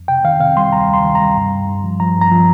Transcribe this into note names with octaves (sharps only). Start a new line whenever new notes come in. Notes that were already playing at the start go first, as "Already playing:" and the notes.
Already playing: F2
C3 G5
D#3 F5
C3 F5
G3 C6
D2 A#5
D2
C6
D#3
A#5
G3
G2
G2
G2
F3
F3 A#5
G2 A#5
F3